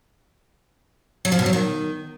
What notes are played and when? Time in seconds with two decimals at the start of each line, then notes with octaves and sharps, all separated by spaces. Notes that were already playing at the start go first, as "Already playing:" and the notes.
1.25 F#3
1.32 F3
1.39 B2
1.46 F#3
1.53 D#3